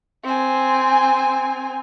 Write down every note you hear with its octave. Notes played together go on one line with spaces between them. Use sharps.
C4 G#5